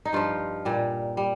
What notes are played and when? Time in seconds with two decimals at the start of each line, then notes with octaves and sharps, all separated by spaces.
0.05 D#4
0.13 G2 F3 F4
0.65 A#2 G3
1.17 G3